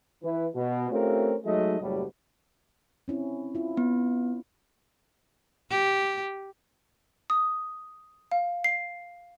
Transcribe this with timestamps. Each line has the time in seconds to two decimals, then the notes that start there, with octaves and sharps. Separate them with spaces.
0.23 E3 E4 B4
0.55 B2
0.90 A3 C4 C#4 F4 G4 A#4
1.45 F#3 G#3 A3 D#4 D#5
1.81 F#1 A2 F#3 G3
3.08 C4 C#4 E4
3.55 E4 F4
3.77 B3
5.70 G4
7.30 D#6
8.32 F5
8.64 C7